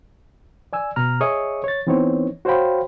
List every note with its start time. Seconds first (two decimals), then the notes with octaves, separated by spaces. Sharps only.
0.73 D5 G#5 E6
0.96 B2 A#5 F6
1.21 G#4 C#5 D#5 E5 C#6 D#6
1.64 C#5 A6
1.87 E3 B3 C4 D#4 C#5
2.45 F#4 C5 C#5 F5 G5 B5